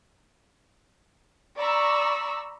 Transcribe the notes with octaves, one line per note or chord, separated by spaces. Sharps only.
D5 A#5 B5 C#6 E6